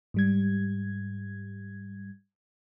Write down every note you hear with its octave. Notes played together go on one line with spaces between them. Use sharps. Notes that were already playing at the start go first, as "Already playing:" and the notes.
G#2 G3 G#6